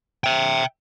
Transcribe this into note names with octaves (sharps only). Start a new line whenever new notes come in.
E5 G5